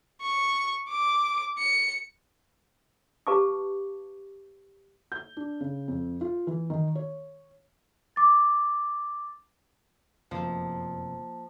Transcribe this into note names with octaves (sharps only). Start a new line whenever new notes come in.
C#6
D6
C#7
G4 B4 F5 A5 C#6 D6
G6
D4
C#3
F2
F4
E3
D#3
C#5
D6 A6
F1 F#2 F3 A#3 A5